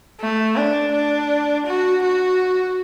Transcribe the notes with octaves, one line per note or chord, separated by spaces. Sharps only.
A3
D4
D4
F#4
F#4